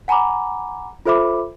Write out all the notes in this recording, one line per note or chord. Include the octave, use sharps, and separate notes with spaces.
F#5 G#5 A#5 B5 D6
F4 A4 C5 E5 B5 D6